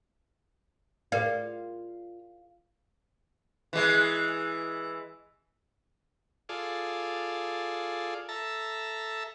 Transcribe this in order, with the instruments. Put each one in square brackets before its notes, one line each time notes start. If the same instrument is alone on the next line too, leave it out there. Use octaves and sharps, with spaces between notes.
[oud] F4 [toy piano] G#4 A#4 D5
[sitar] E3 G#3
[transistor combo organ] F4 G#4 A4 D5
A4 E5 A5 A#5